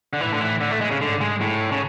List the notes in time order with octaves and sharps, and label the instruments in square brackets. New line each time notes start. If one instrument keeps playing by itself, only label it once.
[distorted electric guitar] D3
[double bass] A2 [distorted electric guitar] E3
[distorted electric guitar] D3
E3
D3
A3
G#3
C#3
[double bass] G#2 [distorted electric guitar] D3
[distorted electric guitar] G#3
A2
C#3